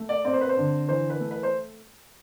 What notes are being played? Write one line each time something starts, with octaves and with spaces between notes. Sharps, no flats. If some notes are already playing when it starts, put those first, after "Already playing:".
Already playing: A3
D5
C4 D5
C5
B4
C5
D3
E3 C5
B4
A3
B4
C5